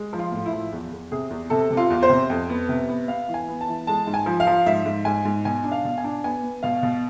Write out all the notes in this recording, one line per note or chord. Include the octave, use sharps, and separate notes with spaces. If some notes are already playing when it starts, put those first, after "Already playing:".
Already playing: G#3
F3
F4
A2
E4
F3
E2
E2
C3 G#4
E2
C3 A4
C3
F4
E2
C5
C3
F2
B3
C3
B3
B3 F5
E3
G#5
B3
A5
E3
G#3 A5
G#2
G#5
F3
F5
F3
G#2 E5
G#2
G#2 G#5
G#2
B2 G#5
D4
F5
B2
G#5
D4
B3 G#5
B3
B2 F5
B2